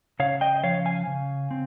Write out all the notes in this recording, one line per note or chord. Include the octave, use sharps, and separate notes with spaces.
C#3 C#5 F5
D#5 G5
D#5
F3 C#5 F5
F5 G#5
C#3
C4